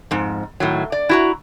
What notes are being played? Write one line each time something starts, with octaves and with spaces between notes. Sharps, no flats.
F2 G#2
A2 D#3 F#3
D5
E4 F#4 A#5